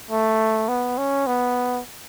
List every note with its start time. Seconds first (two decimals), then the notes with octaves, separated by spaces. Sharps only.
0.11 A3
0.68 B3
0.98 C#4
1.27 B3